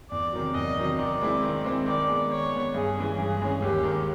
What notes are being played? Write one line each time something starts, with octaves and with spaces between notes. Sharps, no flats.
E2 D5
C3 D#3 F#3
E2 D#5
C3 D#3 F#3
D#3 D5
G#3 C4 E4
D#3
G#3 C4 E4
D#3 D5
G#3 B3
D#3 C#5
G#3 B3
G2 G#4
E3 G#3 C#4
G2 G#4
E3 G#3 C#4
D#2 G4
D#3 G#3